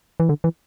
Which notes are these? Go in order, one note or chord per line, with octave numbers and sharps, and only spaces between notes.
E3
D3
E3